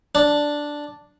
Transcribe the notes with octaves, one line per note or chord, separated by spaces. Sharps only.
D4